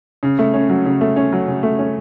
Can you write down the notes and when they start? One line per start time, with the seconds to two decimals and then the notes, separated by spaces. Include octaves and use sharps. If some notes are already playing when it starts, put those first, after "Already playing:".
0.23 C#3
0.39 A3
0.54 C#4
0.69 F#3
0.86 C#3
1.01 A3
1.16 C#4
1.33 F#3
1.48 C#3
1.63 A3
1.79 C#4